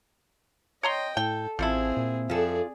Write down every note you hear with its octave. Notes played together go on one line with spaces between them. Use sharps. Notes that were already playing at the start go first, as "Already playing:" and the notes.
C#5 D#5 G5 A#5 C6
A2 A4 G5
A1 F3 A3 C4 E4 G#4
A#2
F2 F4 G#4 A4 D5